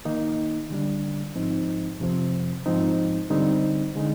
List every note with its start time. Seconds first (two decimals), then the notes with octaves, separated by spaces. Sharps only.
0.05 D#3 A#3 D#4
0.70 D3 G3 D4
1.35 G#2 F3 C4 D#4
2.00 F2 C3 F3 C4
2.66 G#2 F3 C4 D#4
3.30 D3 G3 C4 D#4
3.95 D3 G#3 D#4